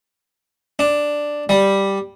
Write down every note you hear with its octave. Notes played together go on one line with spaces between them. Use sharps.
D4
G3